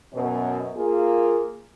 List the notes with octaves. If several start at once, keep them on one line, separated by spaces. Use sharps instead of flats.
F#2 B2
A#3 F4 G#4